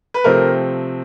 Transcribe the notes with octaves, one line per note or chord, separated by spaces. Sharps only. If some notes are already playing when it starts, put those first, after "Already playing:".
B4
C3 F3 A3 C4 A#4